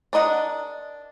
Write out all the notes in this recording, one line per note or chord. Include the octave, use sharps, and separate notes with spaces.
D4 A#4 D#5 F#5